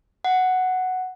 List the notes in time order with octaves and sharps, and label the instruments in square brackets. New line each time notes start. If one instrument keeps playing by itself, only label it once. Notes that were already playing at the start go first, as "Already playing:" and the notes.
[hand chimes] F#5